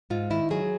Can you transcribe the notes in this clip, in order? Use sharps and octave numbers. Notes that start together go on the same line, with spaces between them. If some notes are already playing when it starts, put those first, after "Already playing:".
G#2 F4
D#3 E4
F#3 G#4